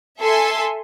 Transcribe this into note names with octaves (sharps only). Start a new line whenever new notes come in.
A4 E5 G#5 C6